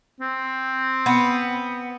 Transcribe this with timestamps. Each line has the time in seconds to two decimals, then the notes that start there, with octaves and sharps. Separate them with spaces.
0.20 C4
1.06 B3